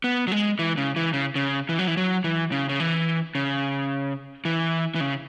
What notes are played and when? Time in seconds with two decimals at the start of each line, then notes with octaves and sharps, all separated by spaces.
0.04 B3
0.27 F#3
0.32 G#3
0.59 E3
0.77 C#3
0.96 E3
1.13 C#3
1.35 C#3
1.69 E3
1.79 F#3
1.87 E3
1.97 F#3
2.24 E3
2.52 C#3
2.69 C#3
2.80 E3
3.35 C#3
4.45 E3
4.95 E3
5.00 C#3